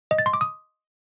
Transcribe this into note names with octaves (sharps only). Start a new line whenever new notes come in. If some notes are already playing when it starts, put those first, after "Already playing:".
D#5
A6
C6
D6
D#6